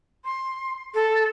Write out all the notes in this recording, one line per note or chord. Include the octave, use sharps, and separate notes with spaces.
C6
A4